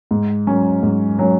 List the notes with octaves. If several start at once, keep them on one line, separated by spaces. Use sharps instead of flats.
G#2
F#3 C#4
G#2
F#3 C#4